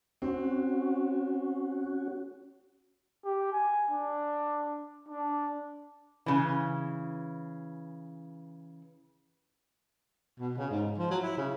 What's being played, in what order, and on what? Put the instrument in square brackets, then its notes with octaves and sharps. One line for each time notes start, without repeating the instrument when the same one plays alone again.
[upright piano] C4 [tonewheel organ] C#4 F#4
[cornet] G4
G#5
D4
D4
[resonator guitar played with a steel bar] C#3 E3
[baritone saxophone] B2
C#3
G#2
F3
F#3
E4
C#3